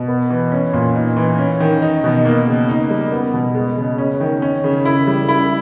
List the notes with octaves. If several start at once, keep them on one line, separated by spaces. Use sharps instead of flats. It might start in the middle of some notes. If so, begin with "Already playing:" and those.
Already playing: B2
B3
E3
C#4
A#2
D#4
E3
C#4
D#3
D#4
B2
A#3
C#3
D#4
G3
B3
B2
G#3
C#3
C#4
D#3
C#4
C#3
E4
G3
E4